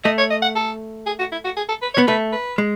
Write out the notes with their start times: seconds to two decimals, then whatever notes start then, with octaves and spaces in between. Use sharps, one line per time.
0.04 A3 D#5
0.18 C#5
0.30 D#5
0.42 F#5
0.56 A4
1.06 G#4
1.19 F#4
1.32 E4
1.45 F#4
1.57 G#4
1.69 A4
1.82 B4
1.94 C#5
1.98 B3
2.07 A3 B4
2.32 B4
2.58 G#3